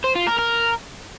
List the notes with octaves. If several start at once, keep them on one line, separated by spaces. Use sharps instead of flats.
C5
F4
A#4
A#4